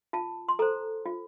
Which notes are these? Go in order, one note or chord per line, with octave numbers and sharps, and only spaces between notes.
F4 A5
C6
A4 C5 A#5
F4